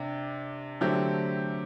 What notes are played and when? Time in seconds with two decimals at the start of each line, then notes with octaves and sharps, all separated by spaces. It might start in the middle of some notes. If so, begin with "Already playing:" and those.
Already playing: C3 D4
0.81 D3 F#3 A3 C4 G4